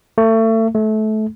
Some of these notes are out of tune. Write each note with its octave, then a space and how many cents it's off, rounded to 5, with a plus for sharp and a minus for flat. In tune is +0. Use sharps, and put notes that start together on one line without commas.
A3 +30
A3 -25